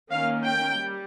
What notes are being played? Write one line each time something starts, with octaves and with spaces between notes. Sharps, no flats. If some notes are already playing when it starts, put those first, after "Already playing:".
D#3 A#3 C#4 F5
G5
G3